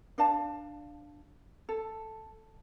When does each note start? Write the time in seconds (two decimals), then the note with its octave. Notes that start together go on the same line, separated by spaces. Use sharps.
0.18 D4 D5 F5 A5
1.69 A4